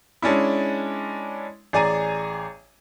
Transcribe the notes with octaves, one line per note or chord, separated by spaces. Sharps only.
G#3 C#4 D4 E4
A1 G#4 D5 G#5 A#5 D#7